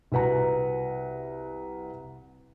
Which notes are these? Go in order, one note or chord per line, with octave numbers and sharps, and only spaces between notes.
C2 F#4 B4 F#5 A#5